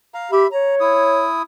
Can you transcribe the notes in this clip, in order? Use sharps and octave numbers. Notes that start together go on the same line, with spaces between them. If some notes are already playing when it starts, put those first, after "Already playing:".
F5 A#5
G4 E5 B5
C#5 A#5
E4 D#6